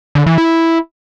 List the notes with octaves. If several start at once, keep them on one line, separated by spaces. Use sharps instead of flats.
D3
E3
E4